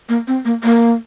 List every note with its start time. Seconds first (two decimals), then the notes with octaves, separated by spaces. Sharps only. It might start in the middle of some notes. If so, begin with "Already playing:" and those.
0.09 A#3
0.27 C4
0.45 A#3
0.64 A#3